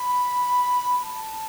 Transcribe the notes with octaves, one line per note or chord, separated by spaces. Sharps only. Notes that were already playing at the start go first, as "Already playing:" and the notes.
Already playing: B5
B5
A5